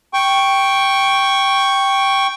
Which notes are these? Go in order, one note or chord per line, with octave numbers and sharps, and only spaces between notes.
G5 C#6